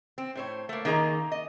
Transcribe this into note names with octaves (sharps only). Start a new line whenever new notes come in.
C4
A2 C5 C#5
A3 A#3
D#3 A#3 G#4 D#5 A#5
D#5